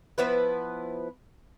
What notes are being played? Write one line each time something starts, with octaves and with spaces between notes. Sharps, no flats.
F3 B3 E4 B4